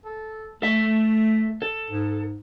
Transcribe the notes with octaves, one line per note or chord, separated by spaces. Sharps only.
A4
A3 A4 E5
A4
G#2